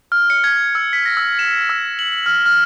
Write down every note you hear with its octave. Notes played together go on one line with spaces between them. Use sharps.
F6
C#7
G#6
E6
B6
A#6
E6
E7
E6
F#7
F6
F6